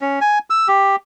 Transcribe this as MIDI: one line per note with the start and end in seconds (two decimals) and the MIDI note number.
0.01 0.19 61
0.21 0.39 80
0.50 0.68 88
0.68 0.96 67